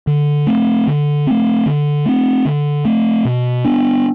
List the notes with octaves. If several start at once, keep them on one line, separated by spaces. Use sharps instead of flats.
D3
A3 C4
D3
A3 C4
D3
A3 C4
D3
A3 C4
B2
B3 D4